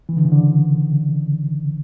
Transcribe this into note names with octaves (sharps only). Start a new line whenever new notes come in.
E3
D3
C#3
D3